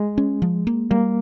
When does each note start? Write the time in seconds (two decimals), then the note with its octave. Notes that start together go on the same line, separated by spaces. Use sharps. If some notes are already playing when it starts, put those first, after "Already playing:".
Already playing: G#3
0.18 C#4
0.42 F3
0.67 A#3
0.91 G3 A#3